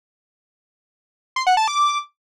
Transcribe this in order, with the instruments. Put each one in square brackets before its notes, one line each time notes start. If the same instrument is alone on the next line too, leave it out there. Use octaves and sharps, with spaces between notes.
[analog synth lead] C6
F#5
A5
D6